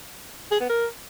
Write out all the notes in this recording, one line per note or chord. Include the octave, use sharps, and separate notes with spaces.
G#4
B3
A#4